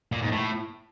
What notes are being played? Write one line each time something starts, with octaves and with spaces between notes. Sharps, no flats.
A#2
G#2
A2